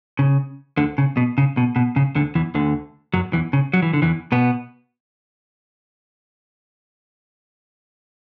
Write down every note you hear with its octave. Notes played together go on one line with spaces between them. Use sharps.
C#3
D2 D3
C#3
B2
C#3
B2
B2
C#3
D2 D3
E2 E3
D2 D3
F#2 F#3
E2 E3
C#3
F#3
E3
D3
E2 E3
B2 B3